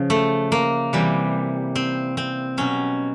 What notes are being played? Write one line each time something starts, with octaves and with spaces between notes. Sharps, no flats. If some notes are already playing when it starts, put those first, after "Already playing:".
Already playing: C#3 F3
A3
A#3
C3 E3 G3
C4
C4
B2 F#3 C#4